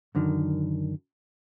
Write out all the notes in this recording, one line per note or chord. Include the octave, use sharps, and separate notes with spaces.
F#2 D3 D#3